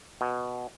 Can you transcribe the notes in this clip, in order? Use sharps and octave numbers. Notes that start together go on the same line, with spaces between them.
B2